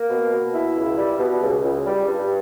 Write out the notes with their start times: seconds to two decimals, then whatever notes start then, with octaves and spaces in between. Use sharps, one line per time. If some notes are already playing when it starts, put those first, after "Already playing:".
Already playing: A#3
0.10 B2
0.33 B2
0.54 E4
0.76 C#2
0.98 G3
1.19 B2
1.42 C#2
1.64 C#2
1.86 G3
2.08 G2